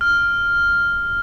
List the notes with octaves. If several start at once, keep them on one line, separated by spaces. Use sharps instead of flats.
F6